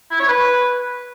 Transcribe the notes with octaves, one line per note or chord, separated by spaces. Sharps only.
E4
C#5
B4